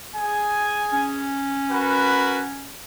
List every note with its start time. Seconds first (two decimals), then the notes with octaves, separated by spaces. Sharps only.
0.15 G#4 G#5
0.92 C#4
1.72 F#4 A#4 B4